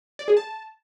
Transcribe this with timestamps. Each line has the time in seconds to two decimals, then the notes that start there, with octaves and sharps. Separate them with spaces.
0.19 D5
0.28 G#4
0.37 A5